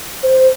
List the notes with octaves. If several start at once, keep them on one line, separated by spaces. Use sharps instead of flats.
C5